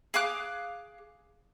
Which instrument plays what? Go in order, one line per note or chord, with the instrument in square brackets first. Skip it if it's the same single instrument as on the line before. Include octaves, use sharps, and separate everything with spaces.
[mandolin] G#4 F5 D6 F#6